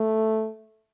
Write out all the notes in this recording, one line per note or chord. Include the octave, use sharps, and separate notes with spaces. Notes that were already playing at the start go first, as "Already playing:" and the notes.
Already playing: A3